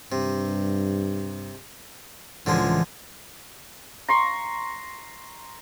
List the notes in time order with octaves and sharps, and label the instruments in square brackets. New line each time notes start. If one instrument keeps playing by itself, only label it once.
[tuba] G2 [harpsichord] C3
[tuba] C#2 [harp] A2 E3 [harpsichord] D3 F3 G#3
[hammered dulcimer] A#5 C6 C#6